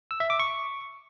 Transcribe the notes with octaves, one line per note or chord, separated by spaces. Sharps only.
E6
E5
D6
C#6